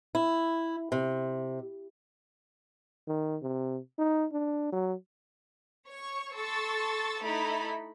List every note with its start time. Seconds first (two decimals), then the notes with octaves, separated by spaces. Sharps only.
0.15 E4
0.92 C3
3.08 D#3
3.43 C3
3.98 D#4
4.32 D4
4.72 F#3
5.86 C#5 C#6
6.34 A4 C6 C#6 E6 A6
7.22 A3 D#4 E4 A4 B5